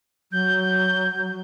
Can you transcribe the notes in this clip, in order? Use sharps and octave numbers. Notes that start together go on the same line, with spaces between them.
F#3 G6